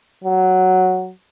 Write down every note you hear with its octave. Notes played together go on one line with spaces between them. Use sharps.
F#3